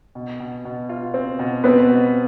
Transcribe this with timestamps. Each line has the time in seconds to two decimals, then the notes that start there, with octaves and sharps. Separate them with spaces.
0.15 B2
0.40 B2
0.65 B2
0.89 F4
1.14 C4
1.39 B2
1.64 B3 C4
1.89 B2